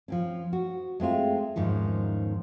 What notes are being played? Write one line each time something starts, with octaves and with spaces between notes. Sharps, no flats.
F3 C4 C#4
F#4
G#3 A3 C4 F4
E2 G#2 D#3 F3 C#4